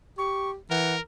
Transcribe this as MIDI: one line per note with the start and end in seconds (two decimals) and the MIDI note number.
0.18 0.56 67
0.18 0.50 85
0.70 0.96 52
0.70 1.01 70
0.70 0.95 78